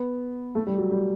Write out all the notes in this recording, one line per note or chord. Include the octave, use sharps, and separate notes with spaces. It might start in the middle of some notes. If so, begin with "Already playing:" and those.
Already playing: B3
A3
G3
F#3
G3